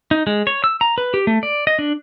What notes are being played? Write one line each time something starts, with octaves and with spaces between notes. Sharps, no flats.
D#4
G#3
C#5
E6
A#5
B4
G4
A3
D5
D#5
D4